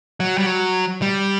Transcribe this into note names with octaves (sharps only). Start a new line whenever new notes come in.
F#3
G3
F#3
G3